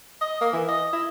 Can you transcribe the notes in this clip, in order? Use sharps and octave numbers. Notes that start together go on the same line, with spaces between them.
D#5
A#3
E3
D#5
E4